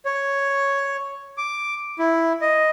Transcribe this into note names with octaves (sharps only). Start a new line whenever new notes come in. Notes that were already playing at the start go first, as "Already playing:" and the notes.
C#5
D6
E4
D#5